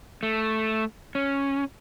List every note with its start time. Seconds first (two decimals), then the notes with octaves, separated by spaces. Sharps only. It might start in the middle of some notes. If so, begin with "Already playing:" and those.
0.23 A3
1.15 C#4